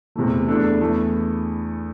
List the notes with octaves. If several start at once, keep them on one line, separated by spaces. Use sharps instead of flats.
E2 C3 E3 A3
E2 E3 A3 D4 A4
E2 E3 A3